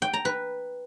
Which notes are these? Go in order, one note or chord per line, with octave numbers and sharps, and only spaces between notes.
G5
A#5
B4